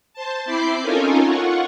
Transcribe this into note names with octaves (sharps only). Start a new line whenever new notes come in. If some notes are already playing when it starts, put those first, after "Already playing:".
C5 A5
C4 E4 B5 D6 G6 C7
C#4 D#4 F4 A4 A#4 G#5
F4 F#5 C#6